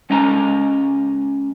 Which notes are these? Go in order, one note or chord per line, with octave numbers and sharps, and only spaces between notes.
G#3 C#4 D#5 F5 G#5 A#5